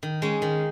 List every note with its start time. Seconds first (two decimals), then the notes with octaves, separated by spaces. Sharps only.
0.03 D#3
0.22 G#3 C#4
0.42 D#3